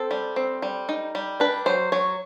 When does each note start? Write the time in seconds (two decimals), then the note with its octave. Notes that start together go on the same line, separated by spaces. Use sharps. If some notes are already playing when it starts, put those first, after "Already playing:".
Already playing: C4 A4
0.11 G3
0.36 C4
0.62 G3
0.89 D#4
1.15 G3
1.40 D4 B4
1.66 F#3 C5
1.92 F#3 C#5